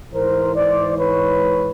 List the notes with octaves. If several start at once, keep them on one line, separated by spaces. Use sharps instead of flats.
G#2 E3 A#4 C5
C5 D5
B4 C#5